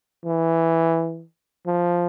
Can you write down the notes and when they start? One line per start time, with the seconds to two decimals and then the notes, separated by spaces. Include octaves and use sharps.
0.25 E3
1.66 F3